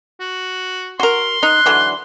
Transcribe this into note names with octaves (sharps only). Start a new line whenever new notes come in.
F#4
F#4 A#4 C6
D#4 F#6
D3 E3 F#3